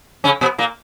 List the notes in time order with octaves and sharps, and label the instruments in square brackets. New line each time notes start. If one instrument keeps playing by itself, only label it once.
[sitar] C#3 C#4
B2 B3
A#2 A#3